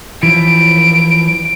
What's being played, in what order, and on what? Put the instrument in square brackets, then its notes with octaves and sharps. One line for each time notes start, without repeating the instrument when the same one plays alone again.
[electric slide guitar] E3 F3 [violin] D7